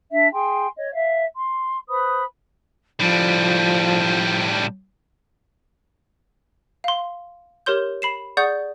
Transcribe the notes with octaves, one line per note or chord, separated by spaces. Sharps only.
D4 E5
G#4 G5 G#5 C6
C#5 D#5
E5 F5
C6
B4 C5 B5 D#6
A2 F3 G3
F5 C6
G4 A#4 C#5 C6 G6
B5 C7 E7
G#4 D5 F#5 C#6 D#6 G6